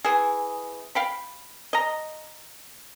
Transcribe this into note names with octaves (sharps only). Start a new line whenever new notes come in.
E3 G#4
F5 G5 B5
D#5 A#5